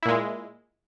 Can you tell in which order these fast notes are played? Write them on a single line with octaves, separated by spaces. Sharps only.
E4 A#2 G#3